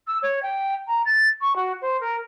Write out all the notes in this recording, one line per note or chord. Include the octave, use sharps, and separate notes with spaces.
E6
C#5
G5
A#5
A6
C#6
F#4
C5
A#4